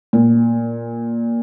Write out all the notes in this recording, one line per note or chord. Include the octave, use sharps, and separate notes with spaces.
A#2